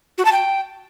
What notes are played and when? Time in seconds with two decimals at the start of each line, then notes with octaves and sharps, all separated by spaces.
0.18 F#4
0.25 A5
0.32 G5